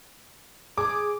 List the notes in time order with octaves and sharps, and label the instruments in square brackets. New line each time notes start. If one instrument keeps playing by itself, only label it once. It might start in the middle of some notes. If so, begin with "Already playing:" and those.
[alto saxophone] G#4 [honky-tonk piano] D6